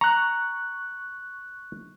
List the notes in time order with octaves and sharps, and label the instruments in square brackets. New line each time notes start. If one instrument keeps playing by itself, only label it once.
[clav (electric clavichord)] A#5 [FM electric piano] C#6 F#6